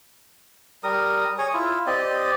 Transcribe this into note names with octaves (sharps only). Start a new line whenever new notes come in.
G3 A#4 D#6
G#4 C#5 G#5 D#6
E4 F4
C4 G4 D5 D#5